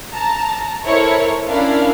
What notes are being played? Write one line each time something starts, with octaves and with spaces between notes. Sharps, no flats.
A5 A#5
E4 A4 A#4 C5 C#5
C#4 D4 E4 A#4 F5